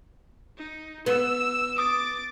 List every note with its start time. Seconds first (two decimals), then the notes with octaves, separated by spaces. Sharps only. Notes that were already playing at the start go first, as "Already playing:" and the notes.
0.57 D#4
1.06 B3 E6
1.78 D6 D#6 A6